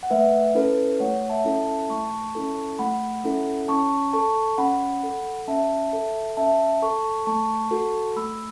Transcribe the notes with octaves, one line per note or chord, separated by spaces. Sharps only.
F#5
A3 B4 E5
C#4 E4 A4 B4
A3 C#5 F#5
E5 A5
C#4 E4 A4
E5 A5
A3 A5 C#6
C#4 E4 A4
A3 F#5 B5
C#4 E4 A4
C#4 A5 C#6
A4 A5 C#6
C#4 F#5 B5
A4
C#4 E5 A5
A4
C#4 E5 A5
A4 A5 C#6
A3 A5 C#6
F#4 A4
A3 B5 E6